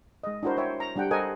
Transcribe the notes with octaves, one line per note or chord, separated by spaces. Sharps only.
G#3 D#5
D4 E4 F#4 A#4 C5
C5 C#5 E5 G5
A#5
G3 D4 G4 F#5 G5
A4 A#4 C5 D#5 F#5 G#5